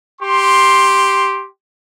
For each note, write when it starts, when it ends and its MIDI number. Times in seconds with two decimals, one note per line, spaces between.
0.21 1.46 67
0.21 1.46 84